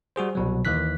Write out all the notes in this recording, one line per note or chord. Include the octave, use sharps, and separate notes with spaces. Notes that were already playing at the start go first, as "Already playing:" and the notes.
G3 F#4 G#4 C5
C2 B2 F#3
D#2 D#3 E3 F#6 B6